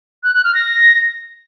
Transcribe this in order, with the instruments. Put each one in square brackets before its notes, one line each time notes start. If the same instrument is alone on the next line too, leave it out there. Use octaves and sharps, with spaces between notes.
[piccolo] F#6
F#6
F6
A#6